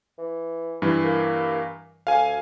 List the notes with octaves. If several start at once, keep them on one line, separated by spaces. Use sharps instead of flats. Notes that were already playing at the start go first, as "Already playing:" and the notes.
E3
G2 E3
A#3
D2 F5 G#5